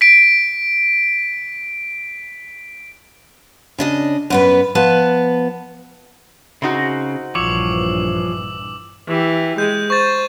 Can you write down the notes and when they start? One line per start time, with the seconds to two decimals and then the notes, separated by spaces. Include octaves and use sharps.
0.01 B6 D7
3.78 C#3 D4 D#5
4.30 F#2 B3 B4
4.75 F3 B3 B4 A5
6.62 C#3 C4 D#4 F#4
7.35 A#1 G2 E3 F3 C#5 D6 E6 F#7
9.08 E3 G4
9.58 G#3 G6
9.90 C5 C#6 A6